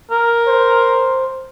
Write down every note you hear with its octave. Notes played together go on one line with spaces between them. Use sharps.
A#4
C5